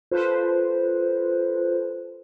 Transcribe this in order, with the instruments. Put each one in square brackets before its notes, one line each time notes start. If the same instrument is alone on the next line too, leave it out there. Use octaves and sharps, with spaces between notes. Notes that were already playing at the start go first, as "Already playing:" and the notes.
[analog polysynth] F4 A4 B4 C5